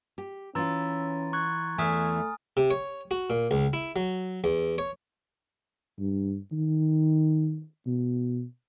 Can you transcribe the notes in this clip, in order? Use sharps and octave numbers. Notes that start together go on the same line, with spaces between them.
G4
E3 C#4 F4 A#5 C6 E6 A6
C#6 F#6 G#6
E2 E3 A3 E5 G#5 D#6 F6
C3
C#5
F#4
A#2
C#2
E4
F#3
E2
C#5
G2
D#3
B2